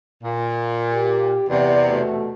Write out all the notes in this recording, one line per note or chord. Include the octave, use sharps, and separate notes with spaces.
A#2
G4
E2 C3 D5
B2 A3